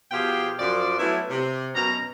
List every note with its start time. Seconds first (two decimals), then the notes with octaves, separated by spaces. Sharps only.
0.12 B2 F3 F4 G4 G#4 G5
0.59 F#2 F3 D5
0.99 F#3 A3 B3 C#4 E4
1.30 C3
1.75 F#2 B2 C#4 A#5